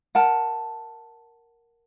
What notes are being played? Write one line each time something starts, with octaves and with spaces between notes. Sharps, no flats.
A#4 F#5 A5